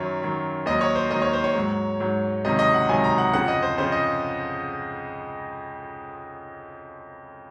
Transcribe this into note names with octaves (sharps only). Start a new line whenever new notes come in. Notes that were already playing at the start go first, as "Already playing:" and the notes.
Already playing: F#2 D#3 F#3 C#5
F#2 D#3 F#3
D#2 D#3 F#3 D#5
C#5
C5
D#2 D#3 F#3 D#5
C#5
C5
C#5
G#2 F#3
G#2 F#3
C#2 C3 D#3 F#3 D#5
D#5
F#5
C#2 C3 D#3 F#3 G#5
A#5
F#5
F2 C#3 F3 F#5
D#5
C5
F2 C#3 F3 C5
D#5